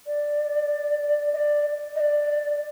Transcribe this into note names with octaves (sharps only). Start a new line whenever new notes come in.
D5
D#5
D5
D#5
D5